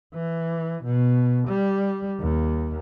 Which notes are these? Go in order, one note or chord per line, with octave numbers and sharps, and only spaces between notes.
E3
B2
G3
D#2